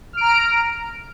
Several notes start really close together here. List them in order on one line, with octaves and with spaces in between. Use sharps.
F6 D7 A#5